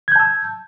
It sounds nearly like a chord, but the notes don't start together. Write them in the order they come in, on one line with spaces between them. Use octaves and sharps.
G#6 G6 A5 E6